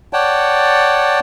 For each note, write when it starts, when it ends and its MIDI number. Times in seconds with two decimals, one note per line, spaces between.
0.13 1.20 73
0.13 1.20 74
0.13 1.20 78
0.13 1.20 79
0.13 1.20 81